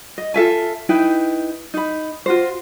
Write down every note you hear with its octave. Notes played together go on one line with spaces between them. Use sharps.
D#5
F4 A4 E5 G#5
D#4 E4 B4 G5
D#4 B5
F4 F#4 C5